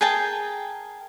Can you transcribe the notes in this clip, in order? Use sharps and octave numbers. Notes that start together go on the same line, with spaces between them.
G#4 A#4 G5 A5